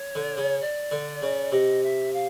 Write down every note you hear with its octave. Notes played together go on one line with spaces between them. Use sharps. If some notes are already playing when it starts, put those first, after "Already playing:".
Already playing: C#5
D3
C#3
D5
D3
C#3
C3 D#5
E5
F5